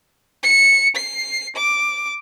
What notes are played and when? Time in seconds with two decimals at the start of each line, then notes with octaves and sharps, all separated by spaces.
0.43 C#7
0.96 C7
1.56 D6